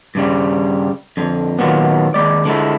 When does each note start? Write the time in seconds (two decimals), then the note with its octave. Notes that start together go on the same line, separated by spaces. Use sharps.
0.15 G2 C#3 G3
1.17 F2 D3
1.58 A#2 D#3 F#3 A#3 B3
2.14 D#2 G#3 D5
2.45 D3 G#3 E4